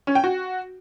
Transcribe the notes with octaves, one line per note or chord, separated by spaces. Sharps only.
C#4
G5
F#4